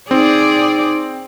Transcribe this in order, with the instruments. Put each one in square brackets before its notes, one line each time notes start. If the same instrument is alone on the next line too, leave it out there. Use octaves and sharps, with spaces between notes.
[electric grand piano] C4 [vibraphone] D#4 [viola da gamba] G#4 D5